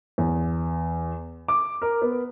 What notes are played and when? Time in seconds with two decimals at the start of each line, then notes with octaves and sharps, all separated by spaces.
0.18 E2
1.48 D6
1.82 A#4
2.02 B3